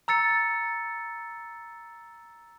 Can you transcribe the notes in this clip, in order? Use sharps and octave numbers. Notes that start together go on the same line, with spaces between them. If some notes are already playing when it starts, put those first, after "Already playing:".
A#5 E6 A6 C#7